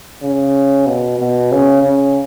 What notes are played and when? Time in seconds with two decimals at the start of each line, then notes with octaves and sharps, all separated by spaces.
0.23 C#3
0.86 B2
1.19 B2
1.52 C#3
1.83 C#3